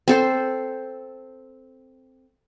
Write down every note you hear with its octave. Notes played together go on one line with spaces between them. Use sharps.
C4 A4 C5